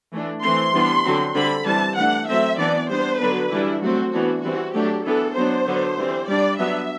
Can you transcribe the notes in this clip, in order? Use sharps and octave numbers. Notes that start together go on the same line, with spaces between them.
E3 A3 D4
E3 A3 C4 C6
E3 G3 B3 D4
D3 F#3 C4
D3 G3 C4 B5
E3 G3 C4 A5
E3 A3 D4 F#5
F#3 A3 C4 E5
E3 B3 D4 D5
G3 B3 D4 C5
D3 F#3 B3 D4 B4
E3 G3 D4 E4
F#3 A3 C4 F#4
E3 B3 D4 F#4
E3 G3 C4 F#4
F#3 A3 D4 G4
E3 B3 D4 A4
F#3 B3 D4 C5
D3 F#3 B3 D4
E3 G3 C4
G3 D4 D5
F#3 B3 D4 E5